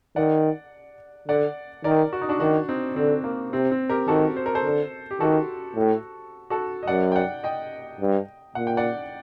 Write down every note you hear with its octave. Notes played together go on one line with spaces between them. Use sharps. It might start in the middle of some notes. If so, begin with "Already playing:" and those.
D#3 D5 F#5
D3 D5 F#5
D#3 A#4 D5
F#4
D#4
D4 F#4
D#3 D4 F#4
C4 D#4
D3 C4
A#3
C3 C4
C4
G4 A#4
D#3 F#4 A4
C5
A#4
A4 C5
D3
G4
D#3 F#4 A4
A2
F#4 A4
D#5
F#2 D5 F#5
G5
D5 F#5
D#5 G5
G2
A#2 F#5
G5
D5 F#5